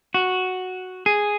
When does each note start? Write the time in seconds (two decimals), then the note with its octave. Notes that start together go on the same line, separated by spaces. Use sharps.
0.14 F#4
1.06 G#4